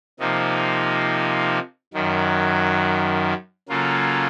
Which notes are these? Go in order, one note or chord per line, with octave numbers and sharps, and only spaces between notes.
C3 F3 A#3 D#4
F#2 D#3 F#3
C#3 F#3 A#3 F4 A4